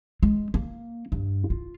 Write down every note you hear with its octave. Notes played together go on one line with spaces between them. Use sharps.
G#3
A#3
G2
F4